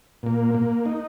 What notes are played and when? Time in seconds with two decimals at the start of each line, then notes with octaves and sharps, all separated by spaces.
0.23 A#2 A#3
0.55 A#3
0.86 D#4